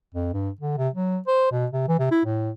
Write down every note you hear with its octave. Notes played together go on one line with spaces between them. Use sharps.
F2
G2
D3
C3
F#3
C5
B2
C3
E3
C3
E4
A2